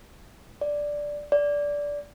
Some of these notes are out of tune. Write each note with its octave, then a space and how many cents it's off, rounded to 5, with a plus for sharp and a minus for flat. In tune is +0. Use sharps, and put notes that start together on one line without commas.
D5 +0
D5 -15